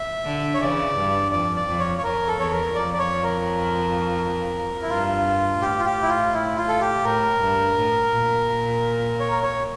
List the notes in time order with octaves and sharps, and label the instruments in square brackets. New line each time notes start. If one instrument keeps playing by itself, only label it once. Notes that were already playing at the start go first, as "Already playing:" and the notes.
Already playing: [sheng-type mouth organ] E5
[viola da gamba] D3
[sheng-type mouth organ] C#5
[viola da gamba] C#3 E3 [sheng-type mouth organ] D5
[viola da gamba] G2
[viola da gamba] F2 [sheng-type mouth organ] D5
[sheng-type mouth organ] D5
[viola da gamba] F2
[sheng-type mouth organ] C#5
C#5
[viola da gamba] F2 [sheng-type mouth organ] A#4
[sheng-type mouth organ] A4
[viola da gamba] E2 [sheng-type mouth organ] C#5
[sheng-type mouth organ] A#4
[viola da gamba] F2 [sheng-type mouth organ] D5
[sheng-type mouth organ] D5
C#5
A#4
E4
[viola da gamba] G2 [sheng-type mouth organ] F4
[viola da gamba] A2 [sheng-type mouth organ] G4
[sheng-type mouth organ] F4
G4
E4
F4
E4
F4
A4
G4
[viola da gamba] A2 [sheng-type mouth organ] A#4
[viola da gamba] G2
A2
A#2
[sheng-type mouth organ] C#5
A#4
C#5